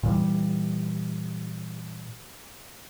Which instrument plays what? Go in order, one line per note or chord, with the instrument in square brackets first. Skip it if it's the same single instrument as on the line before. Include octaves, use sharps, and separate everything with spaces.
[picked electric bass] A#2 E3 G3